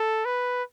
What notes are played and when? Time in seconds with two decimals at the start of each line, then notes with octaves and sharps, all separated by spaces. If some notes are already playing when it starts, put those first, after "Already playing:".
Already playing: A4
0.25 B4